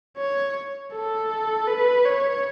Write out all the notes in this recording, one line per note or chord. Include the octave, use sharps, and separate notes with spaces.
C#5
A4
B4
C#5